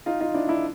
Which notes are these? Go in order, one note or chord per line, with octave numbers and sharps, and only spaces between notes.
D#4 F4
D#4 F4
D4 E4
D4 E4